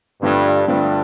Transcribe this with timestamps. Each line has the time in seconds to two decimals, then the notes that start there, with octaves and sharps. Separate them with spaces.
0.22 G2 D3 F3 A3 D4
0.68 G2 D3 F3 A3 D4